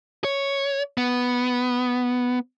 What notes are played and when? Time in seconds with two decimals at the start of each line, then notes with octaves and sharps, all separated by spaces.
0.24 C#5
0.97 B3